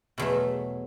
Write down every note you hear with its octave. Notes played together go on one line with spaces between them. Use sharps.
E2 B2 F#3 A3